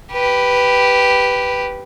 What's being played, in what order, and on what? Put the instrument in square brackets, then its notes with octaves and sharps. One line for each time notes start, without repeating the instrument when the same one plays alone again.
[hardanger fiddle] G4 B4